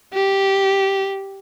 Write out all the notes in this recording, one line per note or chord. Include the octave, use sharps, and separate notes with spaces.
G4